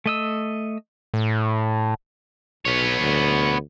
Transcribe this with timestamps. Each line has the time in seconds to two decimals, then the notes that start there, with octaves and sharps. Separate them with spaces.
0.06 A3 D#5 E6
1.14 A2
2.65 B1 B3 C#5
3.01 D2